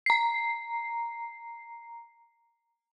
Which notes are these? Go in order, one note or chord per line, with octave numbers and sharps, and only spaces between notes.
A#5 C7